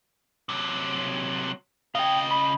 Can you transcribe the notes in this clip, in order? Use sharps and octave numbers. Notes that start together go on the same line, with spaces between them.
C3 F#3
C#3 D#5 F5 G5
B5